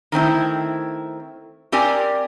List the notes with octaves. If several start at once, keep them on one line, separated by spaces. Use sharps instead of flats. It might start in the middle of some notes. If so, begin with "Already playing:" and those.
D#3 A3 C4 E4
C4 G4 A#4 D5 G#5